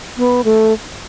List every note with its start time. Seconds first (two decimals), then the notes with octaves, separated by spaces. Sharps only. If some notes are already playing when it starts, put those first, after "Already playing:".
0.17 B3
0.44 A3